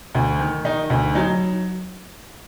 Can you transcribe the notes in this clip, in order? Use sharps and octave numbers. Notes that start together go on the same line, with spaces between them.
D2
D#3
D#3 D#4
D2
F#3 D#4